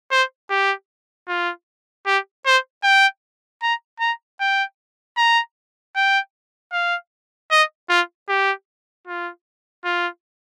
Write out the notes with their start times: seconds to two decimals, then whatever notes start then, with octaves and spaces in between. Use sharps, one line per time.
0.11 C5
0.49 G4
1.28 F4
2.06 G4
2.45 C5
2.83 G5
3.62 A#5
4.00 A#5
4.40 G5
5.17 A#5
5.95 G5
6.72 F5
7.51 D#5
7.89 F4
8.29 G4
9.07 F4
9.84 F4